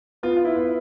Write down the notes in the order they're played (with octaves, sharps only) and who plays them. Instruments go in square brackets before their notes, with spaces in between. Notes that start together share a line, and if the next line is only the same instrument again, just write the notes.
[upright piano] B3 [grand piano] F4
[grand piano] F4
E4
[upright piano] B3